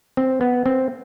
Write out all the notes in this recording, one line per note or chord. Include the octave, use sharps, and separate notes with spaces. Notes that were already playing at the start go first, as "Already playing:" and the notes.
C4
B3
C4